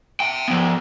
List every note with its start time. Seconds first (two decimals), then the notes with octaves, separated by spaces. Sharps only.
0.20 E5 G5
0.48 F3 B3